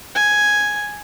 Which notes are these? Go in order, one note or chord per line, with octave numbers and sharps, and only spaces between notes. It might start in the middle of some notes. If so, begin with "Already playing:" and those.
G#5